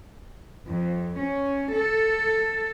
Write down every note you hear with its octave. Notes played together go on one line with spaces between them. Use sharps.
F2
C#4
A4